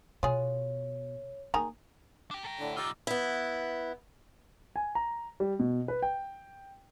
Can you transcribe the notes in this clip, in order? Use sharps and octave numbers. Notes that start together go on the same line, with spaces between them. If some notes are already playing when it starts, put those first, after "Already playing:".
B2 F4 G#4 C#5
D#3 A#3 G#4 A#5
D4 G5
A4 G5 A#5
A2 D3 D4
B1 D#4 F4 G4 D5 E6
B3 E4
G#5
A#5
G3
B2
B4
G5